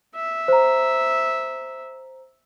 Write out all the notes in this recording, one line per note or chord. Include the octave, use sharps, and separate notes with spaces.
E5
C5 A#5